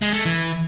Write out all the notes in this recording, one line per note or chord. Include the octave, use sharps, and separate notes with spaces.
G#3
A3
E3